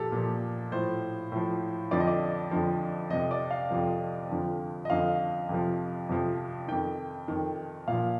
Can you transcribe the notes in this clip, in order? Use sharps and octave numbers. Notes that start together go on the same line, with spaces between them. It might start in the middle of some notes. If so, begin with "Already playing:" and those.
Already playing: A#2 F3 G4 A4
A#2 F3
A2 F3 C5
A2 F3
F2 D3 F3 D5
D#5
D5
F2 D3 F3
F2 C3 F3 D#5
D5
F5
F2 C3 F3
F2 D3 F3
D#5
F2 D3 F3 F5
F2 C3 F3
F2 C3 F3
F2 D#3 G5
F2 D#3
A#2 F3 F5